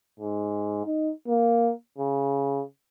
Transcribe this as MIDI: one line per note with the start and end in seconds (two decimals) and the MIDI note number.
0.20 0.85 44
0.86 1.12 63
1.28 1.71 58
1.98 2.63 49